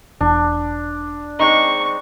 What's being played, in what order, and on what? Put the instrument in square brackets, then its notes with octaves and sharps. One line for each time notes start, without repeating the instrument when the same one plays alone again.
[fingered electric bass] E1 [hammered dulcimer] D4
[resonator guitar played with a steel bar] G#3 C4 D#4 [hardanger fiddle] C#6